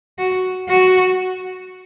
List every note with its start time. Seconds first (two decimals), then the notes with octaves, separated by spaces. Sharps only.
0.18 F#4
0.69 F#4